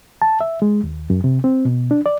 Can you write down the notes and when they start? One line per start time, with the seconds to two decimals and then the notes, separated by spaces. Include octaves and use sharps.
0.22 A5
0.41 E5
0.62 G#3
0.84 D#2
1.10 F#2
1.24 C3
1.44 C4
1.65 B2
1.91 D4
2.06 D5